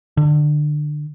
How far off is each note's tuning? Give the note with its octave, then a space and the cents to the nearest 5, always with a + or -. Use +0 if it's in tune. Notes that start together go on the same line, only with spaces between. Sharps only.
D3 +25